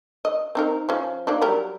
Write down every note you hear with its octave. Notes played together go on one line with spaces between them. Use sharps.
D#5
C4 D#4 A#4
F3 C#4
A#3 D4 D#4
F#3 G3 A#4